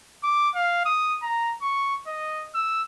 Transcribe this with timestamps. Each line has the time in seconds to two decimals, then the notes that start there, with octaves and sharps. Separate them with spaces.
0.23 D6
0.55 F5
0.85 D#6
1.22 A#5
1.62 C#6
2.07 D#5
2.54 E6